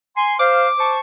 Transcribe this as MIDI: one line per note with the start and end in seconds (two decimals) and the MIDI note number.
0.16 0.34 80
0.16 0.34 84
0.39 0.68 72
0.39 0.68 77
0.39 0.92 86
0.78 1.00 72
0.78 1.00 81
0.78 1.00 85